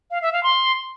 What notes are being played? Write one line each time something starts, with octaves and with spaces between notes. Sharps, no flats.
F5
E5
F5
C6